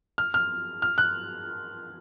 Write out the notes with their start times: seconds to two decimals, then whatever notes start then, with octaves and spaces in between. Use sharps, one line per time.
0.18 F6
0.34 F6
0.82 F6
0.98 F#6